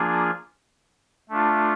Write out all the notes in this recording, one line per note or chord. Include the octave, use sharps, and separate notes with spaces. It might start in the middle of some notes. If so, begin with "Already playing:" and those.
Already playing: F3 A#3 D4 F4 G#4
A3 D4 F4